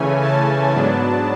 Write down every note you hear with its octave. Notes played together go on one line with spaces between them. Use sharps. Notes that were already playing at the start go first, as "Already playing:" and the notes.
Already playing: C#3 E3 A3 C#4 G#5
A5
G#2 F#3 B3 D4